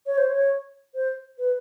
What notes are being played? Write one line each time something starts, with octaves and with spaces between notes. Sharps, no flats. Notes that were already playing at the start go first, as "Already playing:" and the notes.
C#5
C5
C#5
C5
B4